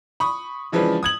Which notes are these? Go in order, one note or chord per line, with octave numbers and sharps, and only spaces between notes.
B5 C#6 D#6
C#3 E3 F3 G#3 D4 B4
D#6 G#6 F#7